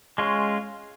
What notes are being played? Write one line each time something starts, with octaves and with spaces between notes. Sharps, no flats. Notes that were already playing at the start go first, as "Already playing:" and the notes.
G#3 C#4 F4